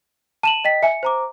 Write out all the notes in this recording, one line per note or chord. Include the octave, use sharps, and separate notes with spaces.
A5 D#7 E7 F#7
D#5 G5 B6
E5 G#5 C#7
C5 A#5 D6